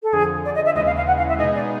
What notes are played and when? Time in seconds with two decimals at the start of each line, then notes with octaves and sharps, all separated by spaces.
0.03 A4
0.13 F2 D3 F3 G#4
0.45 D5
0.55 D#5
0.65 E5
0.75 D#2 C#3 E3 G#3 D#5
0.86 F5
0.97 F5
1.07 F#5
1.18 F5
1.28 E5
1.38 B2 G#3 B3 D#4 G#4 D#5
1.54 D5